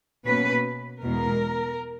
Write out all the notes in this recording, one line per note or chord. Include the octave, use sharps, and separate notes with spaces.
B2 A#3 C#4 B4
E2 B2 G#3 A#4